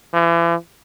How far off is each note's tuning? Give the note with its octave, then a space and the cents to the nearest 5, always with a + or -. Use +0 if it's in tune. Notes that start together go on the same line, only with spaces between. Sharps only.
E3 +40